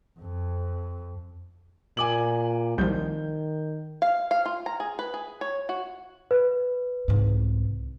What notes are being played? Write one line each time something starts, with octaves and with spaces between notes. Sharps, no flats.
F2
A#2 G#5 D6 F#7
C2 D#3 F3 G6
F5
F5
F4
A#5
G#4
B4
G#4
C#5
F#4
B4
C2 G#2